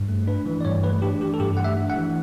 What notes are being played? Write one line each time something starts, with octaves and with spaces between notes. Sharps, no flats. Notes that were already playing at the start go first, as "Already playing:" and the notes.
Already playing: G2
A3
D4 B4
E3
D5
G2 C#5
A3 B4
D4 G4
E3 G4
A4
G2 G4
A3 F#5
E5
D4
F#5
E3